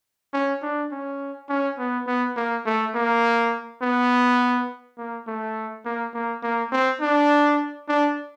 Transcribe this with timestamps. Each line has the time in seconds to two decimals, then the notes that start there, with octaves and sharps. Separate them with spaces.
0.33 C#4
0.62 D4
0.91 C#4
1.49 C#4
1.78 B3
2.07 B3
2.36 A#3
2.66 A3
2.94 A#3
3.82 B3
4.98 A#3
5.27 A3
5.85 A#3
6.14 A#3
6.43 A#3
6.72 C4
7.01 D4
7.88 D4